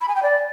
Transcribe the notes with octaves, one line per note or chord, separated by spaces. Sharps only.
B5
G#5
G5
D5